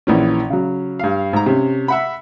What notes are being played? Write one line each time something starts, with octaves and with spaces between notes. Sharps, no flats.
A#1 E3 C#4
C#3 F#3
G2 F5
G#2 A#5
C3 C#4
E5 F#5 B5